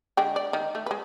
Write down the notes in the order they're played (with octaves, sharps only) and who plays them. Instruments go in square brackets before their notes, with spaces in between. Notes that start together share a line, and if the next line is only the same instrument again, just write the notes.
[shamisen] D3 G#3 G5
D5
D#3
A3
G#3 B4